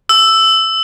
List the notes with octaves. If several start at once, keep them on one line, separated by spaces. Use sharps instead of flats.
E6